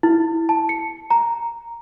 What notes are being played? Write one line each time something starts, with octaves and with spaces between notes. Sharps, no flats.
E4
A5
C#7
A#5